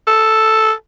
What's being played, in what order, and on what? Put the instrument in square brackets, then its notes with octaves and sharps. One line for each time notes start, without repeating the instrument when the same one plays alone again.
[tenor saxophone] A4